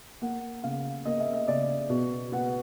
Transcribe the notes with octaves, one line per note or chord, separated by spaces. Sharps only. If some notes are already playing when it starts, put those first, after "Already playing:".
A#3 F#5
C#3 F5
A#3 D#5
E5
D#5
C#3 D5
B2
B3 F#5